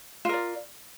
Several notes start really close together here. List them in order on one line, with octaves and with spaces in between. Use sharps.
F4 A#4 D5